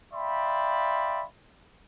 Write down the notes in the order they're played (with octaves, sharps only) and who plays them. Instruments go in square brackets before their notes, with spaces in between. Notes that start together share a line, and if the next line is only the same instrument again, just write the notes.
[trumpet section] D5 E5 F5 G5 B5 C6